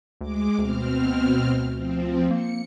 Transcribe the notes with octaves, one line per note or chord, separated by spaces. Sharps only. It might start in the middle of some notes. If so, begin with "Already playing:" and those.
D2 G#3 D6
D2 B2 C4 F6
F3 C4
A#3 C#7